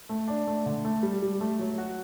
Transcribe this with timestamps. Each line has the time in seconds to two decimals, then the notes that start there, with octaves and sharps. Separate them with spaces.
0.09 A3
0.28 D4
0.47 A3
0.66 D3
0.85 A3
1.03 G3
1.22 G3
1.41 A3
1.59 F#3
1.78 F#4